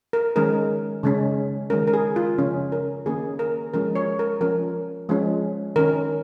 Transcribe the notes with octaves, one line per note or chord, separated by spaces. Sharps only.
A#4
D#3 G#3 C#4 A#4
C#3 G#3 C#4
D#3 G#3 C#4 A#4
A#4
G#4
F4
C#3 F3 C#4
A#4
D#3 A#3 C#4 G#4
A#4
F3 G#3 C#4 A#4
C#5
A#4
F3 C#4 A#4
F3 G#3 C#4
D#3 C#4 A#4